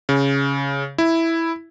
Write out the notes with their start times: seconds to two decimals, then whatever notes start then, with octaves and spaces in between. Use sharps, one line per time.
0.09 C#3
0.98 E4